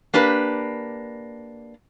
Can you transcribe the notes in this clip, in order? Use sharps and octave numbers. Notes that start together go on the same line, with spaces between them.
A#3 D4 G4 B4